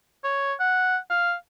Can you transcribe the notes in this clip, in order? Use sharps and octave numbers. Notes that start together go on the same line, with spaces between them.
C#5
F#5
F5